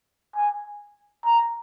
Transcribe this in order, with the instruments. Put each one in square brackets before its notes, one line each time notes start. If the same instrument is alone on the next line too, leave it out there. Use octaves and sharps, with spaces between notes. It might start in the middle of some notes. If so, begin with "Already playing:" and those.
[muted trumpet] G#5
A#5